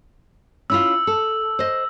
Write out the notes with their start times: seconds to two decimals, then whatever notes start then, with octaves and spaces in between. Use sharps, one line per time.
0.70 C#4 E4 F4 E6
1.07 A4
1.59 C5 D#5